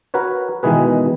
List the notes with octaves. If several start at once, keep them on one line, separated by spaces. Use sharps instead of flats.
F#4 A#4 B4 C#5
B2 D#3 E3 G#3 G#4 B4